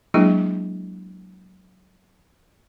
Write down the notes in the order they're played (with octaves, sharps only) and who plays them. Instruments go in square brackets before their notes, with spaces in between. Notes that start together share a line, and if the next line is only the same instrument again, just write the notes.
[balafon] F#3 G#3 A#3 D4 E4 G#4